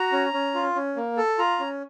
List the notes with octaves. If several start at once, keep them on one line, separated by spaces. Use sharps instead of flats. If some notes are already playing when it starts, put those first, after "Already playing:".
Already playing: F#4 A#5
C#4
C#4
F4
C#4
A#3
A4
F4 A#5
C#4